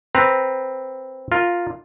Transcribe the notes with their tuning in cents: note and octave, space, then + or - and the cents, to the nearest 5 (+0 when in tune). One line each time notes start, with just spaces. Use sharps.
C4 +5 B4 +0 A#5 +0
F4 +0 A#4 +0